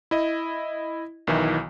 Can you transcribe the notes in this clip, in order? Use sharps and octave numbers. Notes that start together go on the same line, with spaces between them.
E4 D#5
B1 D#3 E3 E4